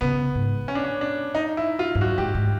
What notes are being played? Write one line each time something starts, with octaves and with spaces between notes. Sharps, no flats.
C#3 B3
G#2
C#4
D4
C#4
D4
D#4
E4
F4
G2
F#2 F#4
G#2 G4
G#2